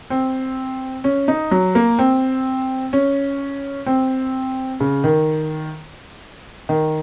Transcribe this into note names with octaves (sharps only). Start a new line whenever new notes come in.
C4
C#4
D#4
F#3
A#3
C4
C#4
C4
C#3
D#3
D#3